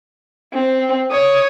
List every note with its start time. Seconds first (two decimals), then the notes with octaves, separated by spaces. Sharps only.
0.53 C4
1.11 C#5 D#6